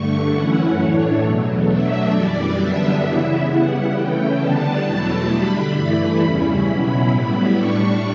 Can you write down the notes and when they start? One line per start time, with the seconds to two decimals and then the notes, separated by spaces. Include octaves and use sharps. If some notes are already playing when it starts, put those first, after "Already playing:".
Already playing: G2 D3 A3 C#6
0.33 F#2 E3 A3 C#4 E4 F#5
0.77 A2 E3 A3 D4 C#5
1.22 E2 B2 F#3 A3
1.68 B2 F#3 A3 D4 E5
2.12 F#2 E3 G3 D5
2.57 F#2 D3 G3 B3 D4 E5
3.03 C#3 E3 B3 E4 E5
3.48 C#3 G3 B3 E4 F#5
3.93 C#3 E3 A3 C#4 G5
4.39 D3 G3 B3 D4 A5
4.84 E2 B2 F#3 A3 E4 A5
5.28 D3 G3 D4 B5
5.73 G2 E3 A3 E4 B5
6.19 E2 C#3 G3 C#4 E4
6.64 B2 F#3 C#4 E4
7.09 A2 G3 B3 E4 B5
7.54 A2 G3 D4 C#6